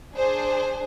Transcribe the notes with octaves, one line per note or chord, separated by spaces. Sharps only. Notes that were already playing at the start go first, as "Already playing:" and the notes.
D4 G#4 C5